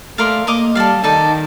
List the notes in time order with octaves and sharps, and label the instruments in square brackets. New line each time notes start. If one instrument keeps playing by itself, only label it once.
[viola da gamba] A3 [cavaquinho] A#4 D5 F5 C6
[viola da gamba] A#3 [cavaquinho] A#4 D#5 A#5 D6
[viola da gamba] G3 [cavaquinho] A4 D5 F5
[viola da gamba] D#3 [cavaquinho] D#4 A4 D5